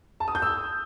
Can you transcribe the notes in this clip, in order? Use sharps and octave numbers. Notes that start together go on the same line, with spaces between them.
A5
D#6
G6
E6